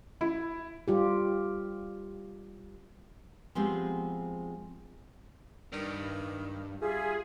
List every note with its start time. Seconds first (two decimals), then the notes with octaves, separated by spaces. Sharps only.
0.21 E4
0.88 G3 F4 G4
3.55 F3 G#3 B3 C4 G4
5.73 G2 D#3
6.82 G3 F4 G#4 E5 G#5